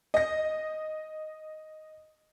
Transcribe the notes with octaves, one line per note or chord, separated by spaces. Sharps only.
D#5 A#6